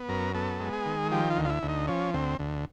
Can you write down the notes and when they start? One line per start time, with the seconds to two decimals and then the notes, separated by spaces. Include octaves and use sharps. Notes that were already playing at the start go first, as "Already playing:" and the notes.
Already playing: B3
0.09 F#2 A#4
0.34 B3 A4
0.60 G#3
0.73 G#4
0.86 D#3
1.11 F3 G4
1.30 F4
1.37 D2
1.45 F4
1.50 E4
1.63 D2
1.69 D#4
1.88 F3 C#4
2.14 D2 C4
2.39 D2